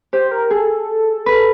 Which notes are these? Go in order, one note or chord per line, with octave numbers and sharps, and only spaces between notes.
G4 C5
A#4
G#4 A4
B4